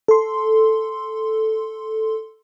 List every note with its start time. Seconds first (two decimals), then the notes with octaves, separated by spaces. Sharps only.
0.08 A4 C6